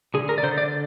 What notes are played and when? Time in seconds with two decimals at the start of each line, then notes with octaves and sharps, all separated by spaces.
0.14 D3 G#4
0.29 A#4
0.38 D5
0.43 D3 C5
0.58 D5